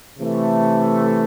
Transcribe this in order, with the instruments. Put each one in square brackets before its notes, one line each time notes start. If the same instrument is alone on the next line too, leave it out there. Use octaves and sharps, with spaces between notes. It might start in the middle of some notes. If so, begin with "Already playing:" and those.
[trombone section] C3 E3 A3